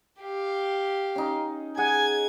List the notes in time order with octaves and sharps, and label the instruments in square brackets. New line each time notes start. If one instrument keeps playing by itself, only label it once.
[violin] G4 F5
[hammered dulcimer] C#4 D#4
[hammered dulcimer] G#4 F#5 [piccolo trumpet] G#5 [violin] G#6